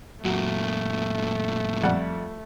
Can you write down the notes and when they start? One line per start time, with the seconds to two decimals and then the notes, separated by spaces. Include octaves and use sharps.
0.24 F#2 A#2 F#3 A3
1.83 F2 G3 F#5